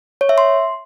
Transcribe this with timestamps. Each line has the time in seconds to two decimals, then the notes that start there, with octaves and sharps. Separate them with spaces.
0.21 C#5
0.29 E5
0.38 C6